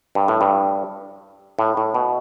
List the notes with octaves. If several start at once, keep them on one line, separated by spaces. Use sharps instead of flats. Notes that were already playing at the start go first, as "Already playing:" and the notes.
G2
A2
G2
A2
A2
B2